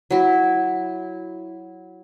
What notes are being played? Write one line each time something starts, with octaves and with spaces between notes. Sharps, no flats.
F#3 E4